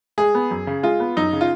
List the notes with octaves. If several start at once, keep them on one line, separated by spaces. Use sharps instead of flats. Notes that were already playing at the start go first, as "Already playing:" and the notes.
G#3 G#4
B3
F#2
C#3
G#3 F4
B3
F#2 D#4
C#3
F4